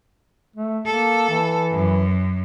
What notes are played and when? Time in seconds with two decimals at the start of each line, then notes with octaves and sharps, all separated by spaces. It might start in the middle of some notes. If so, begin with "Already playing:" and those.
0.56 A3
0.86 A#3 A4
1.30 E3
1.72 F#2